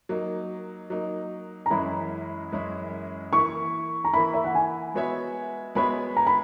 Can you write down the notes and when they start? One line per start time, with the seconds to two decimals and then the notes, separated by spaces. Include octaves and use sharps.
0.09 F#3 A#3 D#4
0.90 F#3 A#3 D#4
1.66 A#5
1.71 F#2 E3 G#3 C#4 E4 B5
2.52 F#2 E3 G#3 C#4 E4
3.33 E3 A#3 E4 C#6
4.04 A#5
4.13 E3 A#3 E4 B5
4.34 E5
4.44 F#5
4.55 G#5
4.94 G#3 B3 F#4 C#5 E5
5.75 G#3 B3 F#4 C#5 E5 B5
6.17 A#5
6.27 B5